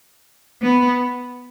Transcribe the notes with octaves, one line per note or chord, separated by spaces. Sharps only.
B3